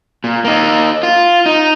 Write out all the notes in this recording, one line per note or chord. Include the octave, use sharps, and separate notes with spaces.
A#2
A#3 D#4
F4
D#4